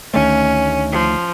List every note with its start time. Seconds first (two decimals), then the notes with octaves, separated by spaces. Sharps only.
0.14 D2 D#3 A3 C#4
0.92 F3